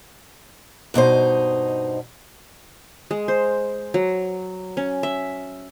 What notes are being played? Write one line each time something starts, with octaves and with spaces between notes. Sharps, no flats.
G2 B2 D#4 C5
G#3
C5
F#3
C#4
E5